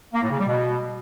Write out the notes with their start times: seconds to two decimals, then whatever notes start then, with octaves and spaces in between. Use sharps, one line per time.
0.14 A#3
0.22 A2
0.30 C#3
0.38 G3
0.46 B2